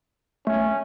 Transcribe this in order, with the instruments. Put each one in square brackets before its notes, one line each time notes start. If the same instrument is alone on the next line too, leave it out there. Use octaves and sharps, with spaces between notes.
[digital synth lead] A3 [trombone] C#4